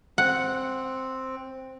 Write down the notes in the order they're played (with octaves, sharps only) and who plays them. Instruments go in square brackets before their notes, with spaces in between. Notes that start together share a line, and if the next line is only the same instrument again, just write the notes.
[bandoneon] C4 [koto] F#5